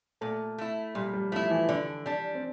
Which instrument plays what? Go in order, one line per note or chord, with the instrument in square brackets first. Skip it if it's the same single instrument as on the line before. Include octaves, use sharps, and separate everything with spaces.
[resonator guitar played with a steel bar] A#2 [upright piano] A3
[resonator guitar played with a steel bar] A3 E4
[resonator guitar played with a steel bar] A#2 [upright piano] G3
[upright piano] G3
[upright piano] F3 [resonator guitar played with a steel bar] A3 E4
[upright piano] E3
[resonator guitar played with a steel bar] D3 [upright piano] D4
[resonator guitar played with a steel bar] G3 D4
[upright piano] C4